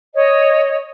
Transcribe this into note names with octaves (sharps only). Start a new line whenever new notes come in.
C#5 D#5